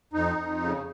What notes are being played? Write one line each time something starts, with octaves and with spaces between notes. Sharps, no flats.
F2 D#4
F2
C#3